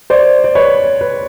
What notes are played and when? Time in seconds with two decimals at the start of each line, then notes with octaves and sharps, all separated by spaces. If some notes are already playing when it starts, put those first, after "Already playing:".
0.10 C5 D5
0.44 D5
0.55 B4 C#5
1.01 B4